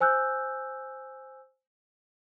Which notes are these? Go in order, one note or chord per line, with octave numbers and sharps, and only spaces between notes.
C5 G#5 E6 F#6 G6